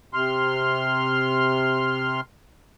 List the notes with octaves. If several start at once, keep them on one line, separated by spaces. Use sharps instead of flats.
C3 C6 F6